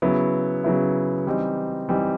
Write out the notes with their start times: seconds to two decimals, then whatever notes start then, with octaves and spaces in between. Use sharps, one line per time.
0.02 C#3 F#3 B3 E4
0.64 C#3 F#3 B3 E4
1.26 E3 G3 C4 D#4
1.89 E3 G3 C4 D#4